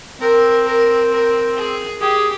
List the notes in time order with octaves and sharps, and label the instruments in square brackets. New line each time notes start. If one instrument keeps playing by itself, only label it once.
[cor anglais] C4 [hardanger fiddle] A#4
[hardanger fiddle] A#4
A#4
G#4
[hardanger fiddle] G4 [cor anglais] G#4